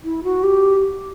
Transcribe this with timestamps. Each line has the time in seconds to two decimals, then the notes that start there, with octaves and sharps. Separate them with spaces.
0.04 E4
0.24 F#4
0.44 G4